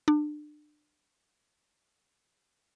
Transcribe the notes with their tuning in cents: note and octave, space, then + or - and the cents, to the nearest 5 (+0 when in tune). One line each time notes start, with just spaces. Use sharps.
D4 +30